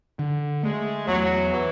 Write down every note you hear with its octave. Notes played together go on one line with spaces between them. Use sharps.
D3
G#3 A3
E2 F#3
E3